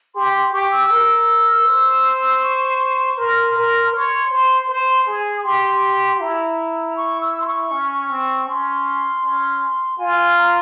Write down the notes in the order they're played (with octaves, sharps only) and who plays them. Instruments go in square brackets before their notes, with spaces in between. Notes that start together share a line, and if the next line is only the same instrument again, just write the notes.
[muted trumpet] G4 [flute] C6
[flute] C6
[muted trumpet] G4 [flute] C#6
[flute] E6
[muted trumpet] A#4
C5
[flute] C#6
[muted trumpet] A#4 [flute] C6
[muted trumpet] A#4
[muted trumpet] C#5 [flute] C6
[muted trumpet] C5
C5
G#4
[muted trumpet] G4 [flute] C6
[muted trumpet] E4 [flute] A#5
[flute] C#6
E6
C6
C#6
[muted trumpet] C#4
C4
[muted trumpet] C#4 [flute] C6
[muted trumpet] C#4
[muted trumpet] F4 [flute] G#5
[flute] A#5